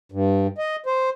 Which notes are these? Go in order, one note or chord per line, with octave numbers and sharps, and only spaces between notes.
G2
D#5
C5